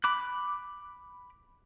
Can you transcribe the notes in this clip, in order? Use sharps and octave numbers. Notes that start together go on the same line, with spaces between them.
B5 D6 F#6